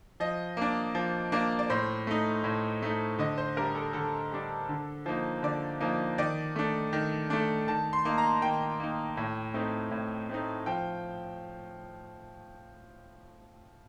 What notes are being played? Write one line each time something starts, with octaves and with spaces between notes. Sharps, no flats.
F3 D#5
A#3 D4
F3
A#3 D4
D5
A2 C5
A3 D#4
A2
A3 D#4
D3 D#5
C5
G3 D4 A#4
A4
D3 A4
G3 D4
D3
F3 A#3 D#4
D3 D5
F3 A#3 D#4
D#3 D5
A3 D4
D#3
A3 D4
D#3 A5
C6
A#3 D#4
A#5
D#3 G5
A#3 D#4
A2
A3 C4 D#4
A2
A3 C4 D#4
F3 G5